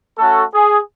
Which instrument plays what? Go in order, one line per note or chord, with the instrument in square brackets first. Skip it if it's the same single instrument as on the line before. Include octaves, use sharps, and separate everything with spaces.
[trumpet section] A3 C#4 F#4 A4
G#4